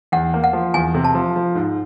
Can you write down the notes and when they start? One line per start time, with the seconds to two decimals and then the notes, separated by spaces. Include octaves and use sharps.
0.12 E2 F#5
0.34 A#3
0.44 F#5
0.53 F3
0.74 E2 G#5
0.94 C3
1.04 A5
1.15 F3
1.36 F3
1.55 G#2